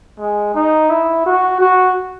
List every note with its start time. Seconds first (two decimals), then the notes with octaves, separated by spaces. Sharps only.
0.19 G#3
0.54 D#4
0.90 E4
1.26 F#4
1.60 F#4